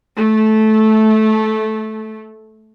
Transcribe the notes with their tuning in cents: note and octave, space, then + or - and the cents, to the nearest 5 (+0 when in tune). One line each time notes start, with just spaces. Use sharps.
A3 -15